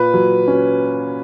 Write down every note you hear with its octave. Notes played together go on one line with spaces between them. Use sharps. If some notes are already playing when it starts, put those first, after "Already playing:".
Already playing: A#2 B4
F#3
C#4